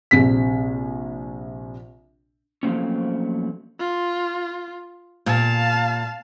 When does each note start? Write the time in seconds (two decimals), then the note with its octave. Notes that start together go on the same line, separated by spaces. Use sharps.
0.11 A#1 C3 B6
2.63 F3 F#3 A3 A#3 C4 C#4
3.79 F4
5.26 A#2 F5 A5